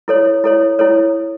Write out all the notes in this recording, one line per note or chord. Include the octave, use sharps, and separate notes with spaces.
E4 A4 C#5
E4 A4 C#5
E4 A4 C#5